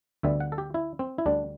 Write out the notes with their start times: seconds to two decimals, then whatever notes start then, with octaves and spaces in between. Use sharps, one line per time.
0.23 D2 D3 G3 B3 E5
0.40 F#5
0.52 A4
0.58 G4
0.74 E4
0.99 C4
1.18 E4
1.26 D2 D3 G3 D4